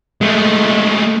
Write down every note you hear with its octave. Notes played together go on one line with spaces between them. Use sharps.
G#3 A3